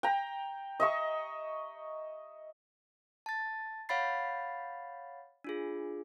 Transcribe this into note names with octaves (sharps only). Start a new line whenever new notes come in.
G5 A#5
D#5 E5 C#6
A5 A6
C#5 F5 F#5 B5 A6 C7
D4 F4 G#4